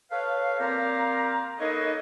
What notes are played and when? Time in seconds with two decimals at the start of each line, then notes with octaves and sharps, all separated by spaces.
0.11 A4 B4 C#5 F5
0.59 A#2 C4 F4 G4 F5 A#5
1.58 A#3 D#4 A4 B4 C#5 D#5